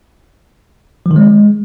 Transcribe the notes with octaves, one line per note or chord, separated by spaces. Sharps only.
F3
D#3
G#3